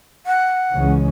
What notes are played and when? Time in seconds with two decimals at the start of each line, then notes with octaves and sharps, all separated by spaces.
0.26 F#5
0.74 C#2 C#3 E3 G#3 C#4